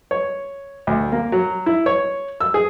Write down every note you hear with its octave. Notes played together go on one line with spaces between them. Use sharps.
C#5
D2
A#3
F#3
E4
C#5
E6
G#4